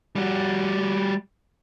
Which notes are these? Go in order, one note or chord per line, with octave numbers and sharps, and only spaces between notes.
G3 F#4